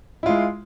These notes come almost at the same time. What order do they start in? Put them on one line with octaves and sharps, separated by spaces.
E4 F4 G#3